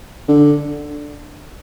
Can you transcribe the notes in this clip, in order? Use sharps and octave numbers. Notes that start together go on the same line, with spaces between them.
D3